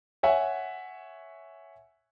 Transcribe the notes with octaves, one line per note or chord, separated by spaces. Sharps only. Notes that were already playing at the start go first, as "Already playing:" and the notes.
C#5 E5 F#5 G#5